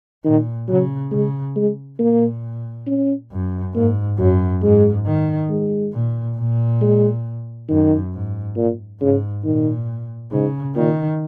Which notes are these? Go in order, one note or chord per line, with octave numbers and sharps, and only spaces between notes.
A#2 D#3
C#3 F#3
C#3 G#3
G#3
A#2 A#3
C#4
F#2
G#2 A#3
F#2 F#3
G#2 G#3
D#3
G#3
A#2
A#2
G#3
F#2 D#3
G#2
A#2
G#2 C#3
A#2 D#3
G#2 C#3
A#2 D#3